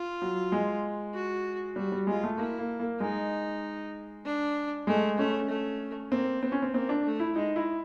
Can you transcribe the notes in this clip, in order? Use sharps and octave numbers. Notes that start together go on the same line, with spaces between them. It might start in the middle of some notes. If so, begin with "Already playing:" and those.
Already playing: F4
F#3
G#3
F#4
G3 F#4
G3
G#3 F4
A3
A#3 E4
A#3
A#3
G#3 D#4
D4
G#3 A3
A3 C#4
A3
A#3 C4
B3 C4
C#4
C4
A#3 C4
D4
A3
E4
G#3 D#4
E4